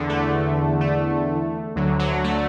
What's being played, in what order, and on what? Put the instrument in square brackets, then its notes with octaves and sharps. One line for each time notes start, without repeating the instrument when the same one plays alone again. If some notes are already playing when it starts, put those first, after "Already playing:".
Already playing: [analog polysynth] E2 D3
A3
A3
D2 D3 F#3
F#3
A3